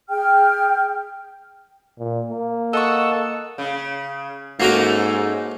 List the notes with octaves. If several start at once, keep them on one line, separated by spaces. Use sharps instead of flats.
G#4 G5 F6
A#2
A#3
A4 D#5 F#5 C#6 E6
C#3
G#2 A3 A#3 C#4 F#4 A#4